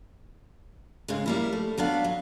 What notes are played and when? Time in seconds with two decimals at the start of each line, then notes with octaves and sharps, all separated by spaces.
1.08 G#2 C#3 G#3
1.26 G3 A#3 E4
1.53 A3
1.78 F#3 B3 D4 F5
2.04 F#3